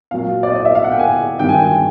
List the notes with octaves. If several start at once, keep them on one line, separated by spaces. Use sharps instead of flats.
A#2 F#3 F5
D5
D#5
D5
E5
F5
F#5
G5
G#5
G2 D#3 F#3 G5
G#5
G5
G#5